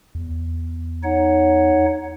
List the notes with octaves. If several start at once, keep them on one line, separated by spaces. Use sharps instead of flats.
E2
D#4 C#5 F#5